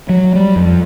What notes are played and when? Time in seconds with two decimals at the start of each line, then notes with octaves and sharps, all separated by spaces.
0.09 F#3
0.35 G3
0.56 F2